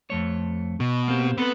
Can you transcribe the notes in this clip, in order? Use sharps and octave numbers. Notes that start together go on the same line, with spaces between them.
F2 A3 C#5
B2
A#3 C4 G4
B3 C4 A4 B4